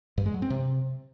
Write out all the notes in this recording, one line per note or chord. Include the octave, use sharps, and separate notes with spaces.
G2
G#3
F#3
C4
C3